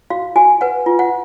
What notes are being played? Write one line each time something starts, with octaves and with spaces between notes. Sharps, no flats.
F#4 F5
F#4 G#5
B4 F#5
F4
F#5